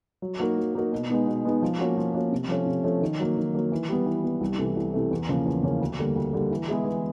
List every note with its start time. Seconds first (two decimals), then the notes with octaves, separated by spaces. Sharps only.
0.22 F#3
0.39 A#3 D#4 F#4 A#4
0.58 F#3
0.75 A#3 D#4 F#4 A#4
0.92 B2
1.10 G#3 B3 D#4
1.27 B2
1.45 G#3 B3 D#4
1.63 F3
1.79 A#3 C#4 F#4
1.97 F3
2.14 A#3 C#4 F#4
2.32 C3
2.49 F3 A3 C#4
2.67 C3
2.84 F3 A3 C#4
3.02 D#3
3.20 F#3 A#3
3.37 D#3
3.55 F#3 A#3
3.72 E3
3.89 G3 B3
4.06 E3
4.24 G3 B3
4.41 C2
4.58 C3 E3 A3
4.77 C2
4.94 C3 E3 A3
5.11 E2
5.29 C#3 F3 A#3 C#4
5.46 E2
5.63 C#3 F3 A#3 C#4
5.81 D2
5.99 D3 G3 A#3
6.16 D2
6.33 D3 G3 A#3
6.51 E3
6.68 G#3 B3 E4 G#4
6.85 E3